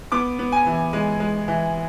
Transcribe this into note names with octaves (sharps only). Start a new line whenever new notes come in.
B3 D6
B3
G#5
E3
G#3
G#3
E3